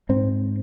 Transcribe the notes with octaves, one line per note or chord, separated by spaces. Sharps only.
G#2 C4